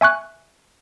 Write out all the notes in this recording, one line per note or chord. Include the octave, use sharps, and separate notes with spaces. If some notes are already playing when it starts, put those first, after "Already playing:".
E5 G#5 C#6 F#6